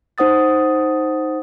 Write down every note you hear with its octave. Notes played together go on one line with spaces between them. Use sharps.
D#4 C5 F#5 D#6 A6